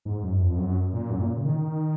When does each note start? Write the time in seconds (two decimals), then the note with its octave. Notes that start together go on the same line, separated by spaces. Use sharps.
0.05 G#2
0.23 F#2
0.40 F2
0.58 F#2
0.93 A#2
1.10 F#2
1.19 A#2
1.36 C#3
1.45 D#3